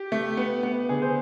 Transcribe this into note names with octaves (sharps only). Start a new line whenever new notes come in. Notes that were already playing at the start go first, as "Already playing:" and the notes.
Already playing: G4
A3
B3
B3
D3 G#4
C5